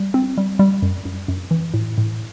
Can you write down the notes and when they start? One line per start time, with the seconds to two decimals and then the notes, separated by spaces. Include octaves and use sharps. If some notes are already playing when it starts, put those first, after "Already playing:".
Already playing: G3
0.14 C4
0.38 G3
0.59 G3
0.82 F#2
1.05 F#2
1.28 F#2
1.51 E3
1.74 A2
1.98 A2